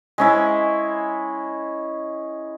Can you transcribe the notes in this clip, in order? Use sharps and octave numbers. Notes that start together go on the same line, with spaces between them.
G#3 C#4 E4